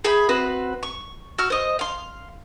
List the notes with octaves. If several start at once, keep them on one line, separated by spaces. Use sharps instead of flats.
G#4 E5 B5 G6
C4 F#4 B4
C#6
F#4 E6 F6
C5 D#5
F5 C6